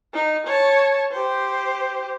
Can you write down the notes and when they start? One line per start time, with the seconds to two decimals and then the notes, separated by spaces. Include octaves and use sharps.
0.14 D#4
0.46 C#5 A5
1.12 G4 C5